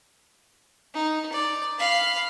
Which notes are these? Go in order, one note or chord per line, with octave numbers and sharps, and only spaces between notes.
D#4
D5
F5 B5